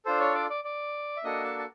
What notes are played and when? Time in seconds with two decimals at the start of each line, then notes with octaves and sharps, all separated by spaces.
0.05 D4 F4 A4 C5
0.20 C#5
0.34 D5
0.50 D5
0.64 D5
1.17 E5
1.24 A#3 D4 F#4 A4 D#5
1.44 A5
1.59 A5